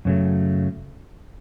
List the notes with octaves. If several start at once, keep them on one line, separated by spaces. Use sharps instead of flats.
F#2 C#3 F#3 A3